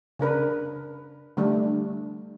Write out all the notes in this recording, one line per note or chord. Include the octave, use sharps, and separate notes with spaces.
C#3 D4 A#4 B4
D3 G3 A3 D4